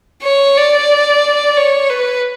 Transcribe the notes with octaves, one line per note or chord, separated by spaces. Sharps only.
C#5
D5
C#5
B4